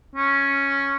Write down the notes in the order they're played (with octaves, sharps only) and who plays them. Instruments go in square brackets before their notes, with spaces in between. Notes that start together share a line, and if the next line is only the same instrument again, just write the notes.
[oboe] C#4